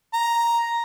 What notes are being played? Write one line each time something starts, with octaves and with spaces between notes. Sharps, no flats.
A#5